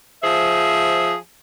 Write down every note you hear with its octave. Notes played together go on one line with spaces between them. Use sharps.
F3 G#4 C5 E5